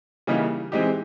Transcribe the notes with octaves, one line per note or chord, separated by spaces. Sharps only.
C#3 E3 G3 A#3 D#4
E3 G#3 C4 D#4 G4